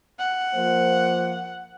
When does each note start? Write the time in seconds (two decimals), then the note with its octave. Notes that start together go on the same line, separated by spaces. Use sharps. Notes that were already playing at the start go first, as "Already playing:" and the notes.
0.19 F#5
0.54 F3 A#3 C5